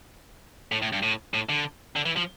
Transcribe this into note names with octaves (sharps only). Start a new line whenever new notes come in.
A2
A2
G2
A2
A2
D3
D3
E3
F3